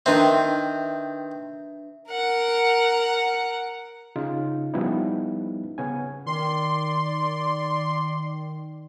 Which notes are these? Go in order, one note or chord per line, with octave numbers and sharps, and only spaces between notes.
D#3 C4 D4 B4 E5
A#4 F#5
C#3 D#4 F4
F3 G3 B3 C#4 D#4 E4
C#3 B3 C#4 G#5
D#3 D5 C6